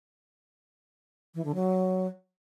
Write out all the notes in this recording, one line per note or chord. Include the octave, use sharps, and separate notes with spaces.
E3
D3
F#3